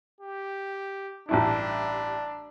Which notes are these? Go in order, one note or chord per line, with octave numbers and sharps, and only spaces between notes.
G4
A1 G2 D4 E4